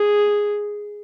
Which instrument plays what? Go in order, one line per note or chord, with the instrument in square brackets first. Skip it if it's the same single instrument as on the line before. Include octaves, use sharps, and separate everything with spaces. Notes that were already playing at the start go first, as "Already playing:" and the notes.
Already playing: [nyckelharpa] G#4